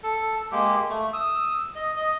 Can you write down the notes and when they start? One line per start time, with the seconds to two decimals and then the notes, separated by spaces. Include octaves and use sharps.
0.03 A4
0.52 G#3 A#3 G4
0.89 A3
1.13 D#6 E6
1.75 D#5
1.96 D#5